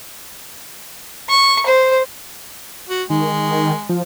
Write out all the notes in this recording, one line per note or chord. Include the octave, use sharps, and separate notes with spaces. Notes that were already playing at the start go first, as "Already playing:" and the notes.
C#6
C5
F#4
D#3 G#3
F3